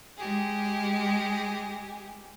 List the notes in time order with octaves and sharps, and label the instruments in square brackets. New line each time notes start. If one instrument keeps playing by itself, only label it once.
[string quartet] G#3 G4 G#4